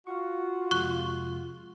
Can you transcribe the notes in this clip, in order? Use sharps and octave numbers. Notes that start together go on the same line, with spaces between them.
F4 F#4 F5 F#5 C#6
F2 C3 G#3 C#6 F#6 G7